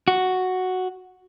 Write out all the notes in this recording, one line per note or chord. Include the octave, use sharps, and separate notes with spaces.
F#4